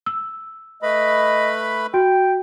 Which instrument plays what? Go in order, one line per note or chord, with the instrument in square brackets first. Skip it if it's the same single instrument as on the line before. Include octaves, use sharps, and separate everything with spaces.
[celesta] E6
[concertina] A3 B4 B5 [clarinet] D#5
[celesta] F#4 [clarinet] G5